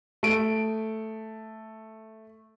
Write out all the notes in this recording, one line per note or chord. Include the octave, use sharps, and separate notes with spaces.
A3 D7